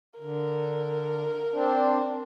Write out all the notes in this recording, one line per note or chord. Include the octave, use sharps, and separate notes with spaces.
D3 A#4
C4 D4